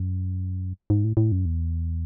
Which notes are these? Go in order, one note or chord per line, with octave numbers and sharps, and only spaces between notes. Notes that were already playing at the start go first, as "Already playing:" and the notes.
Already playing: F#2
G#2
A2
A2
F#2
E2